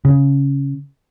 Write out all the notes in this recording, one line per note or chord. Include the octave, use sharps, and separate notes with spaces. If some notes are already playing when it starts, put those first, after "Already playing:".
C#3